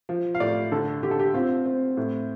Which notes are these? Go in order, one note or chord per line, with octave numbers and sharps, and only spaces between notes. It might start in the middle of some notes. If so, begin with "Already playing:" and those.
F3
F5
A2 D5
D3 A4
D3 G4
A4
G4
C4 F4
C4
A2